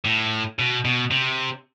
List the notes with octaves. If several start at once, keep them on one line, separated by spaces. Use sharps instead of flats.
A2
B2
B2
C3